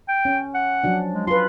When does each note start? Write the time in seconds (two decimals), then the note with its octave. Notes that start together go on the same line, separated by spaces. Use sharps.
0.08 G5
0.25 C#4
0.54 F#5
0.84 F3 F#3 D4
1.13 G#3
1.27 F4 B4 C6